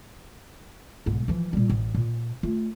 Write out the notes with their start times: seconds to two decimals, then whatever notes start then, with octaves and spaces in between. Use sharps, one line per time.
1.06 B1 G#2
1.28 E3 F3
1.53 A#2 G3
1.70 A1
1.94 A#2
2.43 A3 F4